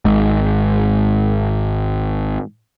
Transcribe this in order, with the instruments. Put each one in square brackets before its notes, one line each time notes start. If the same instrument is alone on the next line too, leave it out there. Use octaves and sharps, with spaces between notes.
[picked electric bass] G#1 G#2